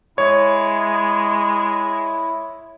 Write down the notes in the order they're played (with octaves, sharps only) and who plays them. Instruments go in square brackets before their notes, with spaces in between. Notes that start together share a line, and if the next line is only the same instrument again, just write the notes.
[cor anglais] G#3 [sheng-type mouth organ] E4 [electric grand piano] C#5